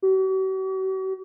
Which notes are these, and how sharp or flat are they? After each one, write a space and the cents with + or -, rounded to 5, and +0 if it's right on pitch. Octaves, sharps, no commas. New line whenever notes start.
F#4 +45